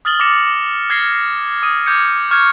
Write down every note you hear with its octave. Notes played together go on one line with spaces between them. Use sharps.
D#6 F6 A6 F#7 G7
D6 A6 A#6 C#7 E7
F6 G#6 A#6 C7 G7
D#6 D#7
D6 F6 G6 G#6 C#7
C#6 F6 G6 G#6 C#7